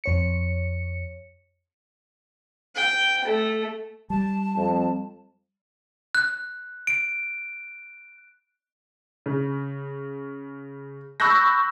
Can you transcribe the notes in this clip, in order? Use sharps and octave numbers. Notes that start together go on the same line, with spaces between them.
F2 C#5 C#7
G5
A3
G3 A5
F2
F#6
D7
C#3
B5 C#6 E6 F#6 G6 A#6